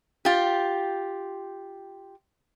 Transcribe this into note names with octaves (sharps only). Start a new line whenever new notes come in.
F4 G4